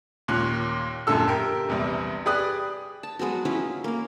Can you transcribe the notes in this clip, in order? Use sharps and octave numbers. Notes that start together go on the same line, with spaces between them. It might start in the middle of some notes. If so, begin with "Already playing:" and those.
D#2 A#2 C#4 F#6
D#1 F#2 A#2 D3 A4 E6
G4 A#4
A#1 E2 C3 G3
G4 G#4 B4 D5 D#6 F#6
A5
F#3 G#3 B3 F#4
F#3 C#4 E4 F4
A#3 A#4